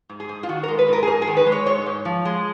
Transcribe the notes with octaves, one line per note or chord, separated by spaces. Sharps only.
G#2
G#4
G#2
F4
D#3 F#4
G#3 A#4
B4
G#2 A#4
G#4
G#2 A#4
G#4
D#3
B4
G#3
C#5
G#2 C#5
G#2
F3
G#3